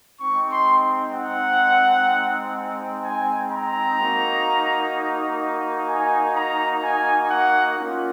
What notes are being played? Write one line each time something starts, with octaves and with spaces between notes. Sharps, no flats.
G#3 C4 D#4 C#6
C6
F#5
G#5
A#5
A#3 D#4 F#4
G#5
A#5
G#5
F#5
A#3 C#4 F4